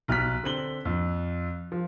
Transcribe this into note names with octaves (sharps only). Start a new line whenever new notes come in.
B1 F6 F#6 B6
D3 C4 F#7 G7
F2
F3